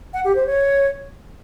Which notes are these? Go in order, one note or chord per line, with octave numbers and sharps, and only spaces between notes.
F#5
G4
C5
C#5